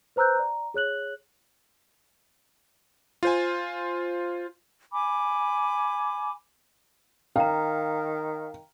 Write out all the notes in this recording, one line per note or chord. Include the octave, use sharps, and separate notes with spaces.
B4 C5 A#5 E6 F#6 G6
D5 A#5
G#4 C#5 F#6 F#7
F4 C5 G#5
G#5 B5 D6
D#3 F5 G5 A#5